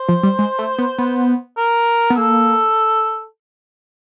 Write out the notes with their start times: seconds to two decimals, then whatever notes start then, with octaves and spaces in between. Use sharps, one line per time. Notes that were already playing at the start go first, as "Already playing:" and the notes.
Already playing: C5
0.09 F3
0.23 G3
0.39 G#3
0.59 A3
0.78 B3
0.98 B3
1.57 A#4
2.10 B3
2.17 A#3 A4